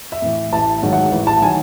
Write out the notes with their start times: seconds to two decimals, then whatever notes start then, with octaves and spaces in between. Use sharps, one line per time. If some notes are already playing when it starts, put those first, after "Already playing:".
0.12 E5
0.22 A2 E3
0.52 A1 A5
0.82 G#2 D#3 F#3
0.93 F#5
1.12 A1
1.27 A5
1.41 D#3 F#3 G#5